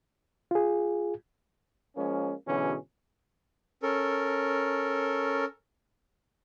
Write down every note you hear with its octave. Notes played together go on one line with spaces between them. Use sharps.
F4 G#4
F3 G#3 A#3 C#4
B2 D3 E3 F#3 C#4 G#4
C#4 A4 A#4